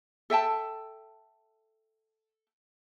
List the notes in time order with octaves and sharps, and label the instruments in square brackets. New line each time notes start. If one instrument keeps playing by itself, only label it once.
[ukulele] A4 E5 G5 A5